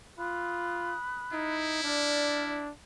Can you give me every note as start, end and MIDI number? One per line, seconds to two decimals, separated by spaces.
0.19 0.95 65
0.19 1.54 83
0.19 1.54 87
0.19 1.54 90
1.32 1.82 63
1.32 2.67 64
1.84 2.71 62
1.84 2.54 74
1.84 2.54 89